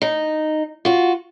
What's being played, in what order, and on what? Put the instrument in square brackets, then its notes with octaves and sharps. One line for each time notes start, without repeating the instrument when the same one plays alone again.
[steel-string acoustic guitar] D#4
F4 F#4